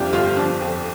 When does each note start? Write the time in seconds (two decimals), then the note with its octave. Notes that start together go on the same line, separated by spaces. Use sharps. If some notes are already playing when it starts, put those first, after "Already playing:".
Already playing: F2 C3 G3 D4 F4 G4
0.13 G1 F4
0.37 F3 D4
0.60 F2